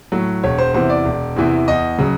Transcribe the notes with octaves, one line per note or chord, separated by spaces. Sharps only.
A2 F#3
E1 C#5
C5
E2 C3 E3 C5
D5
E1
E2 C3 E3
E2 D#5
C#3 F#3